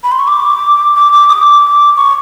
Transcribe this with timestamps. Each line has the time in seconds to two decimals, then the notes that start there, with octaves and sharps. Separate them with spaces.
0.04 B5
0.12 C6
0.19 C#6
0.28 D6
0.96 D6
1.13 D6
1.29 D#6
1.33 D6
1.97 C#6